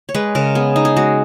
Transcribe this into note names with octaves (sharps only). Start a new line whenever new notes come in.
C#5
G#3 B4
C#3 A#4
B3 G#4
D#4
G#4
G#3 F#4